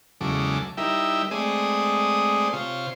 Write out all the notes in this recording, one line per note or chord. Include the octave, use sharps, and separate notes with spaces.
E2 C#3 F#3 G#3 A4 D6
G3 D#4 E4 A#4 E5 G5
G#3 A3 C4 G#4 D5 D#6
C3 F4 C5 C#5